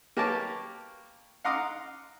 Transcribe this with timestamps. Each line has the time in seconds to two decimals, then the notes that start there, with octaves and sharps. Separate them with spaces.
0.17 A#3 G4 B4 C#5 A5 D6
1.44 F5 F#5 A#5 C6 D6 D#6